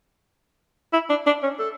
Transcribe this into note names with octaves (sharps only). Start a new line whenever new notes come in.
E4
D4
D4
C#4
A4